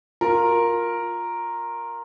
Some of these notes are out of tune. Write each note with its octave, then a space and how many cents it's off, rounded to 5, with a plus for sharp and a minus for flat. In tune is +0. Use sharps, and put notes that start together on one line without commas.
F4 +15 A#4 +0